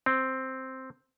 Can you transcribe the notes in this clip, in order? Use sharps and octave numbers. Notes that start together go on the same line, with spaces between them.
C4